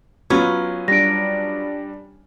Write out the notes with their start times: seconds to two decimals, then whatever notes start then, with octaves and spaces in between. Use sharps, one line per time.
0.30 F#3 B3 C#4 F4 B4
0.88 G3 D4 A#6 D7